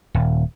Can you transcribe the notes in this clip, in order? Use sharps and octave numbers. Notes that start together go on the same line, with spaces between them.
D#1